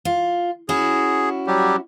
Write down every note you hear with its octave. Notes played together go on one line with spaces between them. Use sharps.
F4
C#4 E4 F#4 G#4
F#3 G3 G4